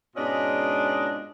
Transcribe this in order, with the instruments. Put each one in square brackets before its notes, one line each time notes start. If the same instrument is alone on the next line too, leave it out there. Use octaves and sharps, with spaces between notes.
[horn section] G#2 B2 C#4 D4 F4 D#5